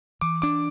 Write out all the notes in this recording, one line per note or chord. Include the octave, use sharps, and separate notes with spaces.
E3 D6
D4 D6